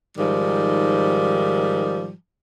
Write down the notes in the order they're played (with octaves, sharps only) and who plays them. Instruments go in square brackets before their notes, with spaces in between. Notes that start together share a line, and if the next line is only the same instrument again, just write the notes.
[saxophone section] G#2 D#3 F3 G3